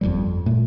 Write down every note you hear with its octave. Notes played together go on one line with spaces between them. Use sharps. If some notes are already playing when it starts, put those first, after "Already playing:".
G1 F2 E3 G3
A#2 A3